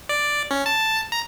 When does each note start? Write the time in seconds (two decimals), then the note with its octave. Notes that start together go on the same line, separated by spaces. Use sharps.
0.09 D5
0.51 C#4
0.66 A5
1.12 A#5